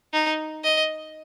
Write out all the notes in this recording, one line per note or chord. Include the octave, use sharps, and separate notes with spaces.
D#4
D#5